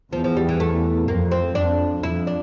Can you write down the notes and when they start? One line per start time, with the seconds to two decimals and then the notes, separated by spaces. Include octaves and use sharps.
0.12 E2 F3
0.24 F3
0.37 G3
0.49 E3
0.60 A3
1.08 F2 A#3
1.31 C4
1.55 F2 D4
2.03 F2 E4
2.27 D4